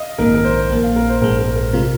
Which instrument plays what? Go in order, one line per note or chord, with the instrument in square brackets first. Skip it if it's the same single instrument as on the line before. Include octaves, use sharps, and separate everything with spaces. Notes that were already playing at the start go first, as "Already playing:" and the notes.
Already playing: [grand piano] D#5 F5
[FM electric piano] A#1 G#2 D#3 A#3 [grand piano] A#4
[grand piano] A#4
C5
[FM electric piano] A#1 A#2 A#3
[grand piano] F5
A#4
C5
[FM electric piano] A#1 G#2 G#3 [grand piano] A#4
[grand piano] A#4
A#4
[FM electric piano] C3 G#3 F4 [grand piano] A#4